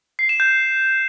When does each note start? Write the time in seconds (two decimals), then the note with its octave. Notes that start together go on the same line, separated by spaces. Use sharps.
0.19 C7
0.29 E7
0.40 G6